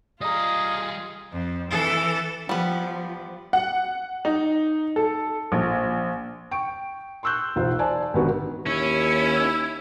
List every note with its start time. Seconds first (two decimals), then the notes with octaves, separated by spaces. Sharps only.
0.21 G3 F4 G#4 D5 D#5 A#5 D#6
1.32 F2
1.70 E3 A4
2.49 F3 G3 B3
3.53 F#5
4.25 D#4
4.96 A4
5.52 A#1
6.51 G5 C#6 D7
7.23 C6 C#6 E6 F#6 G6
7.56 B1 E2 F4 C5
7.79 C5 D5 G#5 A5
8.14 G#1 D3 B3 F#4 A#4
8.66 D#2 C#4 E4